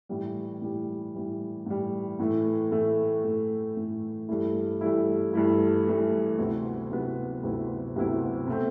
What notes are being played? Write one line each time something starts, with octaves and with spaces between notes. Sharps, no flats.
A2 E3 G3
A2 E3 G3
A2 E3 G3
A2 E3 G3
A2 E3 A3
A2 E3 A3
A2 E3 A3
A2 E3 A3
G2 E3 A3 E4
G2 E3 A3 E4
G2 E3 A3 E4
G2 E3 A3 E4
D2 C3 F#3 B3 E4
D2 C3 F#3 B3 E4
D2 C3 F#3 B3 E4
D2 C3 F#3 B3 E4
B2 A3 C4